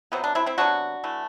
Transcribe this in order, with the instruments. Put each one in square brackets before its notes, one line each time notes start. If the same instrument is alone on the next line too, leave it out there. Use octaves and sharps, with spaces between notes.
[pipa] C3 F#3 B3 C4
D4
C4 E4
C4 E4
C3 F#3 B3 D4 F#4
E3 A3